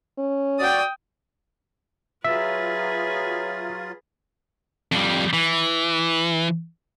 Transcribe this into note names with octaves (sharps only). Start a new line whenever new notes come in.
C#4
F#4 D5 G5 D#6
F#3 F4 G#4 B4 E5
F2 G3
E3